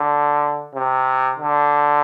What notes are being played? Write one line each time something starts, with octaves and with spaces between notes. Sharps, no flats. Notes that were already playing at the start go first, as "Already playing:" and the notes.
Already playing: D3
C3
D3